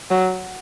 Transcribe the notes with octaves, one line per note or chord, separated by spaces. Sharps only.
F#3